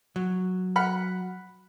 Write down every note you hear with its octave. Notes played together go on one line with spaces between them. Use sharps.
F#3
F#5 B5 F6